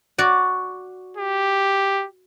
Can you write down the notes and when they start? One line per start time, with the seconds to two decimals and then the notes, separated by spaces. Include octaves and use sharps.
0.18 F#4 D5
1.17 G4